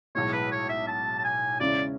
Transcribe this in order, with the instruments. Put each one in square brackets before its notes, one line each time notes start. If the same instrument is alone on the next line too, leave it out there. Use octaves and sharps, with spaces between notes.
[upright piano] B1 A2 G#3 [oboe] C#5
[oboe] B4
C#5
E5
A5
A5
G#5
[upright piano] E2 C#3 G#3 C#4 E4 [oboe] D5